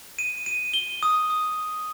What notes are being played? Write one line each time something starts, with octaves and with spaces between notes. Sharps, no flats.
D#7
D#7
G7
D#6
D#6